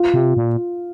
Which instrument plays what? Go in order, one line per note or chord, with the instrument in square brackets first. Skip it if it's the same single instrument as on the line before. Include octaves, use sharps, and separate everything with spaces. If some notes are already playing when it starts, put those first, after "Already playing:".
Already playing: [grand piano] F4
[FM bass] C3
A#2